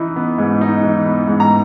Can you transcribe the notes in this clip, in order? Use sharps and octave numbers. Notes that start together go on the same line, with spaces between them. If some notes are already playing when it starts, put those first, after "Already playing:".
Already playing: E3 D#4
B3
G#2
D#4
E3
B3
G#2
A#5